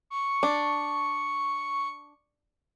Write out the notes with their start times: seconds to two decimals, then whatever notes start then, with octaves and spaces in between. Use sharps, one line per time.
0.10 C#6
0.43 D4